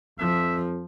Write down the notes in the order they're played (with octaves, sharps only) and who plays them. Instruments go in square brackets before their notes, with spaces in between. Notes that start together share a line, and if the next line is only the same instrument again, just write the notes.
[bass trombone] F2 [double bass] F3 [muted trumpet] E5